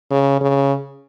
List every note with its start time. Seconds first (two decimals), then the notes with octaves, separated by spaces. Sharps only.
0.11 C#3
0.41 C#3